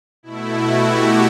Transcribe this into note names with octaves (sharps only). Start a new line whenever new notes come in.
B2 A3 E4
F#4
G4